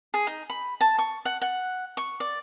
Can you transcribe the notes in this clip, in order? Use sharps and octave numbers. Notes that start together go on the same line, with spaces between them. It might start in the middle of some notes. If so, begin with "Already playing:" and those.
G#4
D#4
B5
A5
C#6
F#5
F#5
C#6
D5